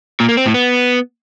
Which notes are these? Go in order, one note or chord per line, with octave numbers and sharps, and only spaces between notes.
A#2
A#3
C4
A2
B3